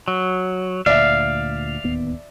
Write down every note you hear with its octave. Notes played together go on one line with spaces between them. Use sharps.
F#3
D2 A#2 D5 E5 F5
D1 D#2 B3